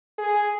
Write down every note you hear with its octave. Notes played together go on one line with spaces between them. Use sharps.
G#4